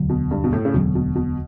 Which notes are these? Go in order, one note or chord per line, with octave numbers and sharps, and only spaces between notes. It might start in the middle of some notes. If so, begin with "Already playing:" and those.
Already playing: E1 D2 D3 F#3
B2
G2
B2
A2
C#3
E1 D2 B2 D3 F#3
B2
B2